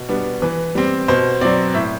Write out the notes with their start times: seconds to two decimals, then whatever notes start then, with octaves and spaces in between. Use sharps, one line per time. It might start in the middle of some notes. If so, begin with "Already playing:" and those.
Already playing: B2
0.09 G3 B3 D4
0.42 E3 B4
0.75 G3 C4
1.08 B2 C5
1.41 F#3 C4 D5
1.74 A2 E5